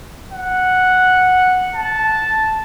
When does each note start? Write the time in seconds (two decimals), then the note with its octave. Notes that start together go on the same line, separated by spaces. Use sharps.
0.32 F#5
1.75 A5